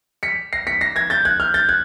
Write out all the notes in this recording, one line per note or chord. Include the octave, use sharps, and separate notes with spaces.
B6 C#7
A#6 C7
B6 C#7
A#6 C7
G#6 A#6
G6 A6
F#6 G#6
F6 G6
G6 A6
F#6 G#6